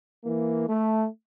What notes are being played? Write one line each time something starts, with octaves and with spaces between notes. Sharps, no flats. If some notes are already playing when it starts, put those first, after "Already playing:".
E3 A#3
A3